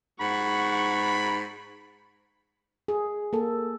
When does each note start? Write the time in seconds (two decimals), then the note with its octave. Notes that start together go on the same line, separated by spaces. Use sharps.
0.21 G#2 F#5 B5 C#6
2.88 G#4
3.33 A#3 A4